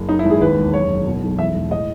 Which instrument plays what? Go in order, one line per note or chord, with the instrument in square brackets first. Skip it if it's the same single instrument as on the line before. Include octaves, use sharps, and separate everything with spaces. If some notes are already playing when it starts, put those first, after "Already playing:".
Already playing: [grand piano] F#1
F#2 D#4
E4
G#1
G#4
D#2 B4
E1
F#2 C#5
F#1
B2
B1
E2 E5
E1
A2 D#5